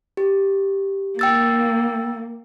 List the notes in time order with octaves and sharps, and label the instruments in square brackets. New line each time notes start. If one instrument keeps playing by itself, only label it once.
[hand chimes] G4
[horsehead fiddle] A#3 [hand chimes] G5 E6 A6